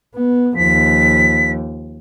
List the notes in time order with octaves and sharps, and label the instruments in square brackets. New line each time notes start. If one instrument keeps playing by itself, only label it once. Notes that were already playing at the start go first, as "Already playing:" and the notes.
[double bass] B3
[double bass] D#2 F3 [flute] B6